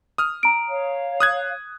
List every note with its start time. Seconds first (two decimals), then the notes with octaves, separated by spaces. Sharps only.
0.18 D#6 F6
0.43 A#5 D7
0.67 C#5 F5
1.20 D#6 F#6 G#6